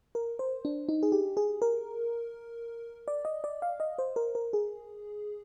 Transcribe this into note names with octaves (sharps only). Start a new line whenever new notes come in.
A#4
C5
D4
D#4
G#4
G4
G#4
A#4
D5
D#5
D5
F5
D#5
C5
A#4
A#4
G#4